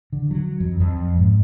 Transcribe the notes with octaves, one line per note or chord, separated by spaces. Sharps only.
D3
F#3
F2
F2
G#2